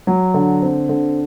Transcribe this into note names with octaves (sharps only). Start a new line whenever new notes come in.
F#3
D3
C4
D3